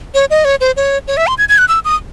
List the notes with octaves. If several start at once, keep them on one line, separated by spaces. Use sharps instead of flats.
C#5
D#5
C#5
C5
C#5
C#5
E5
C6
G#6
G#6
F#6
E6
D#6